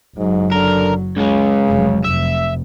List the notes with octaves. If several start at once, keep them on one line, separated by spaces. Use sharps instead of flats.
F#1 G#2 F#3
D3 A#4
C#2 C#3 G#3
F1 F#3
F1 E5